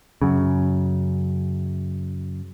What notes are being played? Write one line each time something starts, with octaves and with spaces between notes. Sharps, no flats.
F#2 C#3